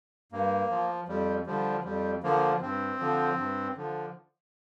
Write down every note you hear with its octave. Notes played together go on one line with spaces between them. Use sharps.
G2 A#3
F3
F2 G3
D3 F3 G3
F2 G3
D3 F3 A#3
G2 C4
D3 F3
G2
D3 F3